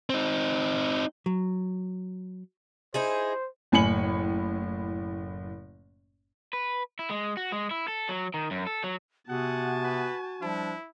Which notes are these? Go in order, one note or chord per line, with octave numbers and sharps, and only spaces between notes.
C4 D#4
F#3
D#4 E4 G#4 C5
F#1 A2 G#5 B5 C#7 F#7
B4
E4
G#3
F#4
G#3
E4
A4
F#3
D#3
F#2
A4
F#3
C3 B3 F#4 F#5 G#5 A5
B4
F3 G3 D4 E4